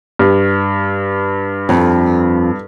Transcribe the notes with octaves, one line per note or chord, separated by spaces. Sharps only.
G2
F2